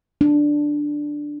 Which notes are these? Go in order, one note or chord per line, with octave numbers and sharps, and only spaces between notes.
D4